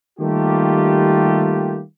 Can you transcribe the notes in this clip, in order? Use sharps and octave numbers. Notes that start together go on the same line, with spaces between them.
D#3 G3 A3 A#3 F4 G4